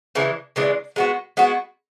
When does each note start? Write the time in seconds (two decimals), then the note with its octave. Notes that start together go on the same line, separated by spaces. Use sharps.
0.15 C#3 E3 G#3 D4
0.56 C#3 E3 G#3 D4
0.96 G#3 B3 F#4
1.37 G#3 B3 F#4